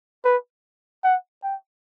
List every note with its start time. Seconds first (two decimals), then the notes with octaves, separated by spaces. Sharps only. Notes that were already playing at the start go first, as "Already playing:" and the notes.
0.25 B4
1.04 F#5
1.43 G5